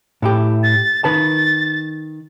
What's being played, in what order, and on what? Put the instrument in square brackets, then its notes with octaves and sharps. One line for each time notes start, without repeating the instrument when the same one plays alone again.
[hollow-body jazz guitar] A2 E4 G4
[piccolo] A6
[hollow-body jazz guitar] D#3 B4 A5 [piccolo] A6